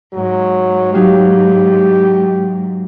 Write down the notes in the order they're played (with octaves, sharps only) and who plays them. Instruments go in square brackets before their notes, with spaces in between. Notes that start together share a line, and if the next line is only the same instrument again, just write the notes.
[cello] G#2 [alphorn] F#3
[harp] F#3 D#4 F5 [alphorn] G4